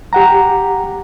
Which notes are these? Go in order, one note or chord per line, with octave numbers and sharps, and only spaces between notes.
G4 F#5 A#5